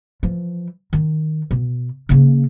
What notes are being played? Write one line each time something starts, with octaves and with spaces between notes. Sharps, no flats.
E3 F3
D#3
B2
C#3 A#3